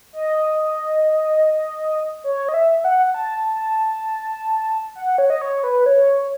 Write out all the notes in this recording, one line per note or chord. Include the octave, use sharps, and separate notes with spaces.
D#5
C#5
D#5
E5
E5
F#5
A5
F#5
C#5
D#5
C#5
B4
C#5